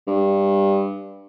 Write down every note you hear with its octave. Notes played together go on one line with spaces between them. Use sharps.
G2